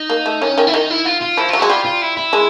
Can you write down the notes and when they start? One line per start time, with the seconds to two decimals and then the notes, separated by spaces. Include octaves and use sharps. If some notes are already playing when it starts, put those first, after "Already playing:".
Already playing: D#4
0.10 A#3
0.26 A3
0.41 D#3 C#4
0.58 D#3
0.67 E4
0.73 D#3 D#4
0.90 E4
1.05 F4
1.21 F4
1.37 F3 E4
1.48 F4
1.53 F#3
1.59 G#3 F#4
1.69 G3 F4
1.85 F4
2.02 E4
2.17 E4
2.33 G#3